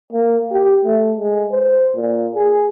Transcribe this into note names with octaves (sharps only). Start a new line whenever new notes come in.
A#3
G4
A3
G#3
C5
A#2
G#4